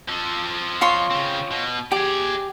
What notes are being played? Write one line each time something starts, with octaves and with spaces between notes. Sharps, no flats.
F3 A4
F4 C#5 C6
C#3 C4
B2
G4 G#4 D5